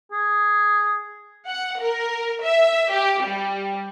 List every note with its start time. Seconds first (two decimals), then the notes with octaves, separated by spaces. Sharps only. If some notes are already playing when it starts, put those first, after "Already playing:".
0.12 G#4
1.49 F#5
1.81 A#4
2.43 E5
2.92 G4
3.25 G3